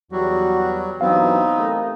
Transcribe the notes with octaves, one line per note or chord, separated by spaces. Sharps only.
E2 F#3 G3 F#4
G2 E3 F#3 B3 C4 D#4 F5
A3 G4 A#4